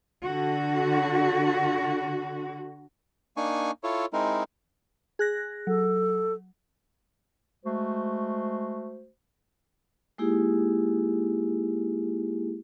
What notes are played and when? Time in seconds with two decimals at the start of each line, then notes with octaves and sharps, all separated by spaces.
0.24 D3 F#4
3.37 A#3 D4 D#4 G#5 C#6
3.84 E4 F4 A4 C#5
4.13 G#3 C4 D#4 E4 A#4
5.19 G#4 F#6 A#6
5.67 F#3 A4
7.65 G#3 A3 F#4 C5
10.18 G#3 A#3 D#4 E4 G4 G#4